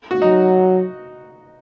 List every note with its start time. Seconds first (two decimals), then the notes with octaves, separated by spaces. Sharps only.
0.11 F#4
0.22 F#3 D#4